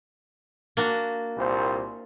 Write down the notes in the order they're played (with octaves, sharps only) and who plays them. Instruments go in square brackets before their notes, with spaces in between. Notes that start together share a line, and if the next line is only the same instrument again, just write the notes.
[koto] A#3 D4 F#4
[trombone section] C2 A#2 C5